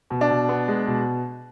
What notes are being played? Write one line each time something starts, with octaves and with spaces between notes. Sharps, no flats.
B2
D4
B2
B3
G#3
B2